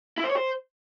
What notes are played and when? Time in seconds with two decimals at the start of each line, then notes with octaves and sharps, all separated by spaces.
0.18 E4
0.24 C5
0.30 C#5
0.36 C5